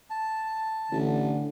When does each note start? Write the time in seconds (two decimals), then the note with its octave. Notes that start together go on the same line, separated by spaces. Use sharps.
0.10 A5
0.91 A1 D3